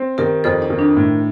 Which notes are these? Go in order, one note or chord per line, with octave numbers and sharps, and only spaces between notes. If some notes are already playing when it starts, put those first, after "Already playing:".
Already playing: C4
D#3 G4 A#4
F2 A4 C5
D#4
D#3
D4
A2